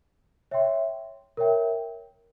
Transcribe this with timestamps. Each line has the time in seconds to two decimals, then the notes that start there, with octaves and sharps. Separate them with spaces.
0.51 C#5 E5 G5 C6
1.37 A#4 C#5 E5 G5